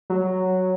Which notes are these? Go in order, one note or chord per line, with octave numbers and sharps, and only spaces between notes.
F#3